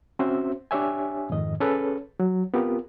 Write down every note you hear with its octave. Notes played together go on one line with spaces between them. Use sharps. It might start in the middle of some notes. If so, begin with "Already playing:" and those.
C4 C#4 F#4 C5 E5
D4 G4 C#5 E5 G#5
F2 G#2 D#3 D#5
C#4 G#4 A4 B4 C#5
F#3
B3 C4 F4 G4 A#4